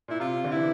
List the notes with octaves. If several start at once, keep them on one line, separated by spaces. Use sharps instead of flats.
A#2 E4
C3 F4
D3
E3 E4